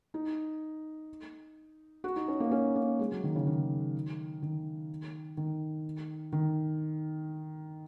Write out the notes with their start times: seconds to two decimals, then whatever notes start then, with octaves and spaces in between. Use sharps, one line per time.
0.14 D#4
2.04 F#4
2.16 D#4
2.28 C#4
2.40 A#3
2.52 C#4
2.76 A#3
2.99 G#3
3.12 F#3
3.23 D#3
3.35 C#3
3.47 D#3
4.42 D#3
5.37 D#3
6.33 D#3